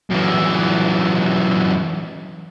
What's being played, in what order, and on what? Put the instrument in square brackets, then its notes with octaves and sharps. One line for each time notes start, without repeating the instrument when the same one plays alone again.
[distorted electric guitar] F#2 E3